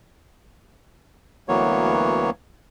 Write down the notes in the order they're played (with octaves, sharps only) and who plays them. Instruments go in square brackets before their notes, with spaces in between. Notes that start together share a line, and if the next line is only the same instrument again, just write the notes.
[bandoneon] D2 E3 F#3 A#3 B3 C#5